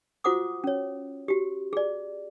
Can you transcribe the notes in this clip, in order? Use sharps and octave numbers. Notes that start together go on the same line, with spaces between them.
F4 F#4 C5 F#5 D6 D#6
C#4 C#5
F#4 G4
G#4 D5